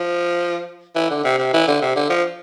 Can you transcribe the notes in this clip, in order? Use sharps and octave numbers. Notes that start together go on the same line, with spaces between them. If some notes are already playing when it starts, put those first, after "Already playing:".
Already playing: F3
E3
D3
C3
C3
E3
D3
C3
D3
F3